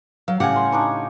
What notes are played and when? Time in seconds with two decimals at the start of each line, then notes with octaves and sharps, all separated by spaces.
0.28 F#3 F5
0.40 A2 C#3 G4 F#5 G#5
0.56 C6
0.72 D4 D#4 C#6